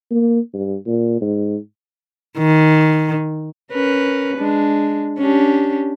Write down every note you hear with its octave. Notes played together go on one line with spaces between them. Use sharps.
A#3
G2
A#2
G#2
D#3
C#4 A#4 B4
G#3 D4
C#4 D4 G4